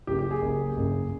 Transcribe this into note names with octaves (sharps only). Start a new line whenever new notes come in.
F#1 F#2 C#3 G4
G4
G#4
F#1 F#2 C#3
F#1 F#2 C#3